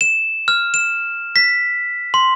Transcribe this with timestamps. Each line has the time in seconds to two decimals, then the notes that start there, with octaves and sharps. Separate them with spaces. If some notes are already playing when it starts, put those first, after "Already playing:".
0.01 E7
0.48 F6
0.74 E7
1.36 B6
2.14 C6